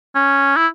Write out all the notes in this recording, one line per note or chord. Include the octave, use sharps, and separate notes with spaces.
C#4
E4